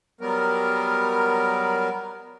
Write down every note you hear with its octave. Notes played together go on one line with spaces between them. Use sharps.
F#3 G3 B3 A#4